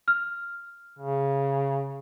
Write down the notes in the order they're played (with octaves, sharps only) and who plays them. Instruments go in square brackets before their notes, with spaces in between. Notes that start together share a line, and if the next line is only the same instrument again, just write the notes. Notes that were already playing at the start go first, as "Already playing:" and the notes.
[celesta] F6
[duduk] C#3